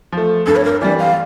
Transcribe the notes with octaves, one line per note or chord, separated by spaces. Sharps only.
F3 A3
G2 A4
C#5
A#4
E3 G3 D5
F5